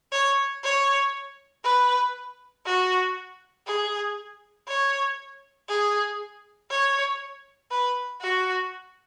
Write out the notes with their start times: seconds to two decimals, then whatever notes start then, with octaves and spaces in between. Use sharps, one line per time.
0.12 C#5
0.64 C#5
1.64 B4
2.66 F#4
3.67 G#4
4.68 C#5
5.69 G#4
6.70 C#5
7.71 B4
8.22 F#4